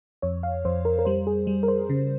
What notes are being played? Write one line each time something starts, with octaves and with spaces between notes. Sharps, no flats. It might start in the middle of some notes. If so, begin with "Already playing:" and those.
F2 C#5
F5
F2 C5
A#4
A#4
G3 C5
G#4
G3
A#4
C5
C#3